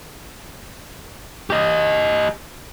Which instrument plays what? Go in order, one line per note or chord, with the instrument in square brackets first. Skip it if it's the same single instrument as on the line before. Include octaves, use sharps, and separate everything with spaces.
[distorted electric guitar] G4 D#5